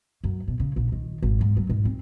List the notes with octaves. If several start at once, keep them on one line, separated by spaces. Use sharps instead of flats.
F#2
B2
C#3
A#1
D#3
G#1
G#2
F#3
G#2
C4